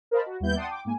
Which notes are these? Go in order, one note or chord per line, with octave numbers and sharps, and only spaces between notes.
A#4 C5 D#5 F5 A5 B5
F#4
D#2 G3 B3 E4 G6
D5 F#5 G5 A5 C6 D#6
G5 D6
G#2 A#3 G#5